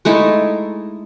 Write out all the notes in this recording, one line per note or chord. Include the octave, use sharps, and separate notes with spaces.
G#3 A3 D#4 E4